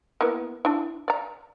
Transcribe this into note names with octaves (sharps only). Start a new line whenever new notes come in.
A#3 B3 E4
D4 E4
D5 A#5